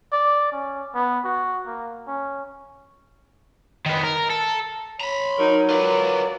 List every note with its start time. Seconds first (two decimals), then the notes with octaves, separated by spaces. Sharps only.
0.12 D5
0.52 C#4
0.95 B3
1.24 F#4
1.67 A#3
2.08 C#4
3.86 D#3 B3
4.04 A#4
4.30 A4
5.01 C#5 A#5 B5
5.38 F#3 D#4 A#4
5.70 F4 A#4 B4 D5